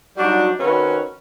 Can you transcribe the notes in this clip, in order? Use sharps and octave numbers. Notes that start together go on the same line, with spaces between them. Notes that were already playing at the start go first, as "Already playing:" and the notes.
F#3 G3 D4 D#4 F#4
D#3 C4 C#4 F#4 B4